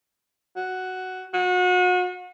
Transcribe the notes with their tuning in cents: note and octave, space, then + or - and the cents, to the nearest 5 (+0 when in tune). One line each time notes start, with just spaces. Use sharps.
F#4 +5
F#4 -35